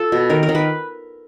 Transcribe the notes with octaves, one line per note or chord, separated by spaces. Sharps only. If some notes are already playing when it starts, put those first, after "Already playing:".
Already playing: F4 A4
B2
D#3 A#4
A#4
D#3
B4